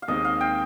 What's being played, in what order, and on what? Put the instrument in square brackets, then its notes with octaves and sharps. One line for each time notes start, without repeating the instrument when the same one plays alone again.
[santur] F5
[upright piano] D#2 D#3 G#3 C4 [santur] D#5
[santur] F5
G5